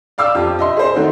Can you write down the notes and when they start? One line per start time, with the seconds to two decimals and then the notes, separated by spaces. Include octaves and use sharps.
0.18 D5 F5 D6 E6
0.35 F2 F4 G4
0.59 D#5 E5 C6
0.77 G#4 C5
0.96 D#3 A3 C4 D#4 F#4